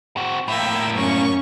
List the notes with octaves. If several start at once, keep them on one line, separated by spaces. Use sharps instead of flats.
C4 F#4
A2 A#3 E5 G5
F#2 C#4 C#6